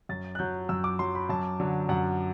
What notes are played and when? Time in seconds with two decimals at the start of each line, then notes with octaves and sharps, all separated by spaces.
0.09 F#2 A6
0.35 F#6
0.39 F#3 G6
0.69 F#2 E6
0.84 D6
0.99 F#3 C6
1.15 B5
1.29 F#2 A5
1.60 D3 F#3
1.89 F#2 F#5